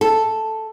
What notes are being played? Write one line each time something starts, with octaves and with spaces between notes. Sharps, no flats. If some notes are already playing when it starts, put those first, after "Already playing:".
A4